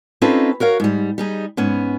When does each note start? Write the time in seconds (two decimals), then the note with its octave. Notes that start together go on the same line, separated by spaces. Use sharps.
0.22 C4 C#4 D#4 F4 A4 B4
0.60 F#4 A#4 C#5 F5
0.80 G#2 G3
1.18 G3 D#4 G#4
1.57 G#2 B3 C#4